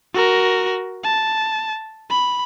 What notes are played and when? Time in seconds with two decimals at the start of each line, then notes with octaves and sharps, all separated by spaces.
0.14 F#4 A#4
1.04 A5
2.10 B5